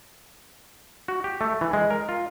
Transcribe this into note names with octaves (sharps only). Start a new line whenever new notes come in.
F#4
G4
A3
E3
G#3
A#4
F4